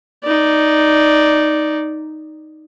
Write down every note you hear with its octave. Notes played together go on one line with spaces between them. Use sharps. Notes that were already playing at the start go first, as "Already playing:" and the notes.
D#4 D5